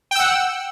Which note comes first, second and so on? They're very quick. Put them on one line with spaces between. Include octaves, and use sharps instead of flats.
G5 E6 F#5